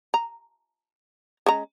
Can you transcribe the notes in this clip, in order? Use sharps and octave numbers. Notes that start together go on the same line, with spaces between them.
A#5
G#3 C#4 A#5